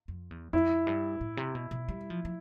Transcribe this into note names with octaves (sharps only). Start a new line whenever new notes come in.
F2
E2
F2 E4
G2
A2
C3
B2
B2
G3
F3
F3